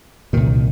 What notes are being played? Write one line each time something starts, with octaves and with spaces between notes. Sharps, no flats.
C2 A#2 D#3